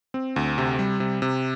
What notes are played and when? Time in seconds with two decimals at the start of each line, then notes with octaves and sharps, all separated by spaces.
0.14 C4
0.36 D2
0.58 C3
0.79 G3
1.00 C3
1.22 C3